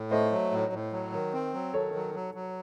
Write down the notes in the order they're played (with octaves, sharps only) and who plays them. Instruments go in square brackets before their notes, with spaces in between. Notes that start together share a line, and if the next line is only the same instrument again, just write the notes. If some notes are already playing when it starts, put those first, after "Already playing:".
Already playing: [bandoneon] A2
[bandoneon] A3 [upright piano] C5 D#5
[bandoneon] F#3
A2
A2
F#3
D#3
C4
F#3
[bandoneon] D#3 [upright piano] A4 C#5
[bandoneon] F#3
F#3
F#3